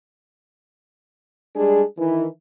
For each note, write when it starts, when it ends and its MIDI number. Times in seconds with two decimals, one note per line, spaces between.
1.56 1.83 55
1.56 1.83 56
1.56 1.83 62
1.56 1.83 68
1.98 2.26 51
1.98 2.26 52